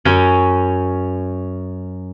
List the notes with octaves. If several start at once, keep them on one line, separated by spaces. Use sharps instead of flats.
F#2 C#4